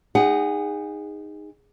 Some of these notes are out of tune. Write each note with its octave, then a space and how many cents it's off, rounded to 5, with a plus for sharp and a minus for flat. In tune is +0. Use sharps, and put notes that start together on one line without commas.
D#4 +0 G#4 -25 F#5 +10